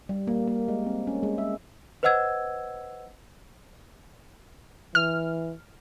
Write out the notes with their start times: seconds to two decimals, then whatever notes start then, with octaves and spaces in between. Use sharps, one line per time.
0.09 G3
0.27 A#3
0.47 A#3
0.68 G#3
0.86 C4
1.07 C#4
1.23 G#3
1.38 E5
2.03 B4 C5 D#5 F#5 E6 G#6
4.95 E3 F6